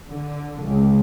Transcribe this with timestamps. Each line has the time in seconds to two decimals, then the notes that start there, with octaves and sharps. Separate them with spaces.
0.10 D3
0.62 C#2